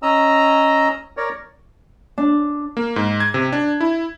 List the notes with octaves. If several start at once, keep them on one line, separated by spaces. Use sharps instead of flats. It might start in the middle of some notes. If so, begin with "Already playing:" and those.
C#4 D#5 A#5 E6
A#4 C#5 D5
D4
A#3
G#2
G#6
C3
D4
E4